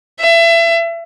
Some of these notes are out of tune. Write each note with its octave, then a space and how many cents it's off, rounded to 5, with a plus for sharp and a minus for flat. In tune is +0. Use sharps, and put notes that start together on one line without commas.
E5 +30